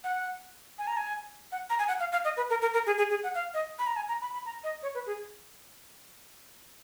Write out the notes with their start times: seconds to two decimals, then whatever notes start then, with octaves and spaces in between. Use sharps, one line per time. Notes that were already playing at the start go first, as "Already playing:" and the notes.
0.04 F#5
0.78 G#5
0.87 A#5
0.97 G#5
1.52 F#5
1.70 A#5
1.79 G#5
1.88 F#5
2.00 F5
2.12 F5
2.25 D#5
2.37 B4
2.50 A#4
2.62 A#4
2.74 A#4
2.86 G#4
2.98 G#4
3.10 G#4
3.23 F#5
3.35 F5
3.54 D#5
3.79 B5
3.87 A#5
3.96 G#5
4.09 A#5
4.22 B5
4.33 B5
4.46 A#5
4.64 D#5
4.83 C#5
4.95 B4
5.06 G#4